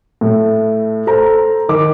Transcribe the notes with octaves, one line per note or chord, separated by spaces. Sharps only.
A2
A4 C5 A#5
D#3 D6